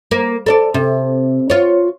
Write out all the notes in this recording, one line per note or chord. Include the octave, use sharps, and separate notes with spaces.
A#3
A4 C#5 D5
C3
F4 C#5